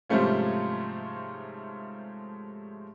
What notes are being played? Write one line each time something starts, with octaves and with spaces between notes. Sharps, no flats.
G#2 C3 F3 G3 A3 C#4